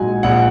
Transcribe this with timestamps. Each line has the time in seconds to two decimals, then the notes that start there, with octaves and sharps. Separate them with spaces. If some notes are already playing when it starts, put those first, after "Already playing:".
Already playing: A#1 G#2 F#3 F#5 G#5
0.23 A#1 F#5